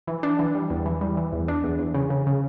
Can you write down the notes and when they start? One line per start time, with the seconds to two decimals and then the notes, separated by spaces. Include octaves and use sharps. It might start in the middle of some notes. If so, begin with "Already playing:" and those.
0.07 E3
0.23 D4
0.39 E3
0.55 G3
0.70 E2
0.86 E3
1.01 G3
1.17 E3
1.33 E2
1.48 D4
1.64 E2
1.79 E2
1.94 C#3
2.10 C#3
2.27 C#3